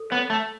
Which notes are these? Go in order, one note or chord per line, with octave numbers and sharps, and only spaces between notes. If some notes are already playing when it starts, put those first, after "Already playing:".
Already playing: A4
B3 C#5
A3